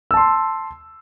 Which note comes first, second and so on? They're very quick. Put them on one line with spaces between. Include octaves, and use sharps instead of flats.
E6 A5 C6